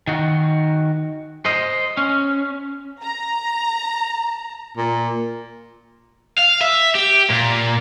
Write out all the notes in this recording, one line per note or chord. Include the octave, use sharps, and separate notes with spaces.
D#3 F#4
C5 D#5
C#4
A#5
A#2
F5
E5
G4
A#2